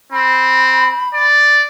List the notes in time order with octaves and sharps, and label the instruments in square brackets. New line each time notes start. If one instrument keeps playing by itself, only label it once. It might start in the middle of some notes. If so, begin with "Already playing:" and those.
[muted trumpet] C4 [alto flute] B5
[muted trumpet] D5